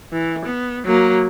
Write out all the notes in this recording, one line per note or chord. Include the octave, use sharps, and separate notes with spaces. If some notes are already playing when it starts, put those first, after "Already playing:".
E3
B3
F#3 A#3